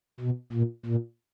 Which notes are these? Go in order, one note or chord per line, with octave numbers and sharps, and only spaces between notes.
B2
A#2
A#2